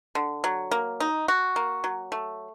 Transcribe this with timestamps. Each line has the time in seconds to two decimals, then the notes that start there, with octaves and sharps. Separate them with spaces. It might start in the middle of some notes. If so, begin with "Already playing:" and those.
0.15 D3
0.44 F#3
0.71 A#3
1.00 D#4
1.28 F#4
1.56 A#3
1.84 F#3
2.12 A3